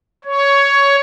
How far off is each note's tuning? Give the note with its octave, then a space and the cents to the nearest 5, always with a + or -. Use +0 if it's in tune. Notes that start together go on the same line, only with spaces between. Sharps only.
C#5 +10